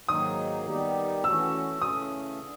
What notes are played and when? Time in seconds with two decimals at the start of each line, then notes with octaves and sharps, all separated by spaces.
0.08 G#2 D#3 F#3 A#3 D#4 D#6
0.66 D#3 G3 B3 D#4 G4
1.24 E3 A3 C#4 F#4 E6
1.82 C#3 E3 A3 C#4 D#6
2.39 D3